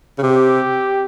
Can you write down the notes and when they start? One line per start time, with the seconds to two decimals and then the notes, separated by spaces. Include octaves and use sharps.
0.18 C#3
0.23 C3 G4